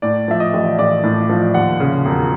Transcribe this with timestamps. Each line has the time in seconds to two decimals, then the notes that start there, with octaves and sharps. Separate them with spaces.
0.02 A2 D5
0.28 F3 E5
0.40 D#5
0.54 A1
0.79 A1 D5
1.03 A2
1.29 F3
1.54 D#2 F#5
1.80 C#3
2.05 E1